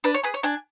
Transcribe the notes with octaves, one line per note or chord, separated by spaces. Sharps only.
D4 B4
C#5
G#4 B4
C#5
D4 G#5